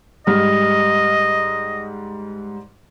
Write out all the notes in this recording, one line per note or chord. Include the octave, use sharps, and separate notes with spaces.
G#2 G3 D#5 F6